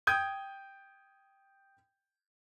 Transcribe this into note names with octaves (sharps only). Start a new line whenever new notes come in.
G5 D#6 G6 G#6 D#7 G7